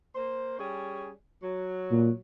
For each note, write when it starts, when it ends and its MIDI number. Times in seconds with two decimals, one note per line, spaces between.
0.15 0.58 58
0.15 0.58 72
0.58 1.11 55
0.58 1.11 61
0.58 1.11 68
1.43 2.19 54
1.91 2.09 46